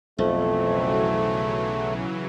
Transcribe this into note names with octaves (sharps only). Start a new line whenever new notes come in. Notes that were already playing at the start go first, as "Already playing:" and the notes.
B1 F2 C#3 E3 F#3 A3